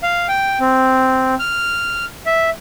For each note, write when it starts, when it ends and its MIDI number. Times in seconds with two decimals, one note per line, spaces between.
0.03 0.27 77
0.28 0.59 79
0.60 1.35 60
1.40 2.05 89
2.26 2.50 76